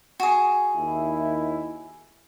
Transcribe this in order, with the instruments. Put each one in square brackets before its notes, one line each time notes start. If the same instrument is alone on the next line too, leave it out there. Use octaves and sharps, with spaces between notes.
[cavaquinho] F#4 G#4
[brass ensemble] D#2 D#4 E4